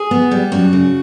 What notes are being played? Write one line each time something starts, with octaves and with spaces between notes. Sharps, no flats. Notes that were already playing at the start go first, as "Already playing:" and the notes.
Already playing: G#4
B3
G3
F#2 F#4
C#3